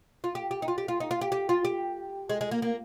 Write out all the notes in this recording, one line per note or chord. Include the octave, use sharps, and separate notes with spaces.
F4
G4
G4
D#4
F4
G4
F4
D#4
F4
G4
G4
F4
G4
G#3
G#3
A#3
A#3